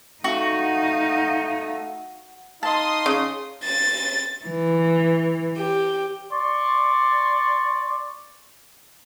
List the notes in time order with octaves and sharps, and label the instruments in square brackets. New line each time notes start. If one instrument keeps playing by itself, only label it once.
[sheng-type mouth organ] A3 [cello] D#4 [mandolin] F#4 [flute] F5
[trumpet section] D#4 D#5 F5 [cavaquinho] A5 [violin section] C6 D#6
[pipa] C#3
[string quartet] A6
E3
G4
[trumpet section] D5 C6 C#6